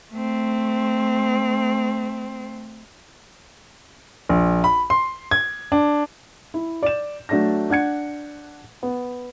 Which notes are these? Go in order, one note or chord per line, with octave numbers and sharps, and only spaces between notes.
A3 C4
A#1
B5
C6
G#6
D4
E4
D5 E7
F#3 A3 D4 A5 A#6
D4 F#5 G#6 C#7
B3